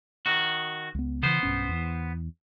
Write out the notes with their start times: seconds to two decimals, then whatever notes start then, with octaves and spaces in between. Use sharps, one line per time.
0.26 D#3 F#4
0.95 C#2 B3
1.23 C#3 E3 B3 C5
1.43 B1 G2 C#4
1.69 E2